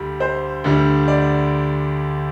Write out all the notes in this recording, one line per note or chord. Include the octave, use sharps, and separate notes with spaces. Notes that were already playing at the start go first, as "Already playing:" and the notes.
Already playing: D2 D3 G3
C5
D2 D3 G3
D5